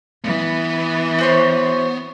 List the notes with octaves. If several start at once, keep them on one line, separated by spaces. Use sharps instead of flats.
E3 B3
F#4 C5 C#5